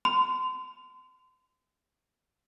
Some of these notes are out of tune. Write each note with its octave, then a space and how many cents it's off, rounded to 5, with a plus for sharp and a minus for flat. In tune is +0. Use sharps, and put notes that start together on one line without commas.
C6 -35